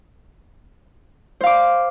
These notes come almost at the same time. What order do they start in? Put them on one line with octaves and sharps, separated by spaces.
C5 F5 D6